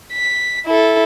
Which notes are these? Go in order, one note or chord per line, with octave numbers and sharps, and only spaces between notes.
B6
E4 A4